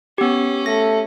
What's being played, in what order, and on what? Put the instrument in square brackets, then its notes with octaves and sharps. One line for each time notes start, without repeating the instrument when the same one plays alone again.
[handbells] B3 G4 [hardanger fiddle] C#4
[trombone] A3 [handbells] A#6